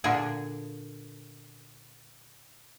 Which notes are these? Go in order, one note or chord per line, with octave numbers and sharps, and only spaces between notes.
A#2 D3 D4 G#4